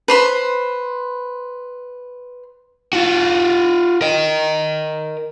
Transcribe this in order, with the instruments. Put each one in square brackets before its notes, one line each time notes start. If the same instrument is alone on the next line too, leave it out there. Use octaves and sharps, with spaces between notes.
[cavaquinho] B4 C5 B5
[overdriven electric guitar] F4 F#4
A#4 D#5